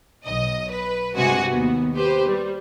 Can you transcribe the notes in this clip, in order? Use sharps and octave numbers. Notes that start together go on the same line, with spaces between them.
B1 D#5
B4
G2 C3 G#3 F#4 G#5
D#2 B3
G4 B4 C5
G3